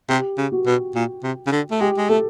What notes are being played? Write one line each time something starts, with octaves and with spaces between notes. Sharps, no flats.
C3 G4
C#3
F#4
B2
A#2
C3
C#3
D3
A3
G#3 G4
G#3
A3 A4